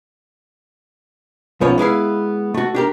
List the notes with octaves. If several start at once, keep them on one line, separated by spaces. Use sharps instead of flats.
B1 A#2 F3 B3 C#4 C#5
G#3 B3 E4 F5
A3 F#4
D4 G4 A#4